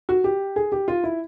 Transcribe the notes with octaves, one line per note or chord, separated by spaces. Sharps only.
F#4
G4
G#4
G4
F4
E4